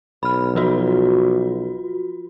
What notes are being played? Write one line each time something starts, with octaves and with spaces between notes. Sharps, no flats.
B1 B5 F6
F3 F4 F#4